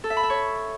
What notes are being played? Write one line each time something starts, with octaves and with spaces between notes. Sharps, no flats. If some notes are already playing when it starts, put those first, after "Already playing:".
A4
E5
B5
E5
C#5